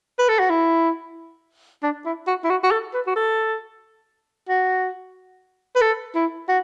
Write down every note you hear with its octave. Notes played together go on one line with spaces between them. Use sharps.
B4
A4
F#4
E4
D4
E4
F#4
E4
F#4
F#4
A4
B4
F#4
A4
F#4
B4
A4
E4
F#4